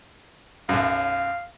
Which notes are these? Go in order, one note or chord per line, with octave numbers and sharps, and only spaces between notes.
B1 F#2 F5